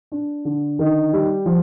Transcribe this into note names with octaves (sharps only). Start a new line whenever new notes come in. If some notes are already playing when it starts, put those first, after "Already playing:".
D4
D3
D#3
G3
F3